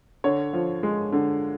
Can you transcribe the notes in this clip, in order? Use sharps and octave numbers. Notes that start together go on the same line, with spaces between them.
D3 C#5
F3
G#3
D3